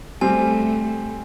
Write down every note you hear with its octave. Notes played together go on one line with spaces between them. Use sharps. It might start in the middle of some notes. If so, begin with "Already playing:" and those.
G3 A3 C4 G#5